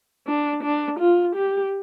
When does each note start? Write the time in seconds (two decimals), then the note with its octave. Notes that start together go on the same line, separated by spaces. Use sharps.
0.27 D4
0.63 D4
0.99 F4
1.35 G4